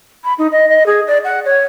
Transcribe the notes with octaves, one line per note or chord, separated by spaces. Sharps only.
B5
D#4
D#5
D#5
G#4
D5
F#5
C#5